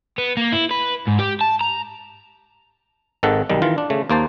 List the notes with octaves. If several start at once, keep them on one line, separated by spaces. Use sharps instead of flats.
B3
A#3
E4
B4
G#2
G4
A5
A#5
G#1 G#2 D#3 A4 F#5
B1 D#3 G3
D#3 E3 F4
D4
C#3 A3
D#2 A#3 C5 A5